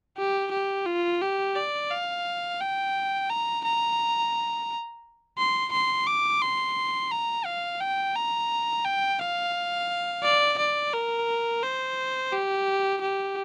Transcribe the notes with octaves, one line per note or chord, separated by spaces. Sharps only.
G4
G4
F4
G4
D5
F5
G5
A#5
A#5
C6
C6
D6
C6
A#5
F5
G5
A#5
G5
F5
D5
D5
A#4
C5
G4
G4